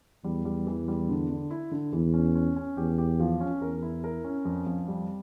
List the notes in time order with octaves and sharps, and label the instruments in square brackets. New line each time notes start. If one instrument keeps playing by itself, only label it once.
[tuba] E2 [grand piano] G3
[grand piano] G3
E3
G3
D3
D3
E4
D3
[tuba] E2 [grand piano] E3
[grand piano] C#4
C#4
C#4
[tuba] E2 [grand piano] G4
[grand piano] G4
F3
C#4
[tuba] E2 [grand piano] A#4
[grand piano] E4
A#4
C#4
F2
F2
G3